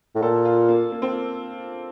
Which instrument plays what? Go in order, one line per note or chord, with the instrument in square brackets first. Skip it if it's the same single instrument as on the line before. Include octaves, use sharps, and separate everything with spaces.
[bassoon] A2
[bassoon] A#2 [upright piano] A4
[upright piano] F4
A#3
A#3
C4
A#3